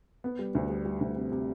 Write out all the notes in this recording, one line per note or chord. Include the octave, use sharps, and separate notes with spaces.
B3
G3
D2
G3
G3
D2
C3
C3